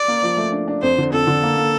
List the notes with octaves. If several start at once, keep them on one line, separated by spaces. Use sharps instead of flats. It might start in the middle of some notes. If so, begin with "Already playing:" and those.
Already playing: D5
A#3
F3
A3
D4
D4
F2 C5
D3
F2 A4
D3
A#3
A#3